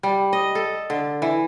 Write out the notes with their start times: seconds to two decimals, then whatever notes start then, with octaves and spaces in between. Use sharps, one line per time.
0.03 G3
0.33 D#5
0.55 A4
0.90 D3
1.22 E3